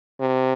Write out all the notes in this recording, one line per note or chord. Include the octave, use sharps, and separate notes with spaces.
C3